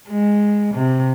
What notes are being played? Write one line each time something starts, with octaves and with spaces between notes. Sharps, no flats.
G#3
C3